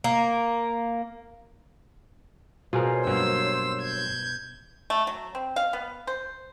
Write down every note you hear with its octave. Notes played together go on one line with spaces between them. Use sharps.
A#3
B2 F4 G#4 A#4 C5 C#5
G2 F#3 A#3 E6
G6 G#6
A3
F#3
C4
F5
B3
C5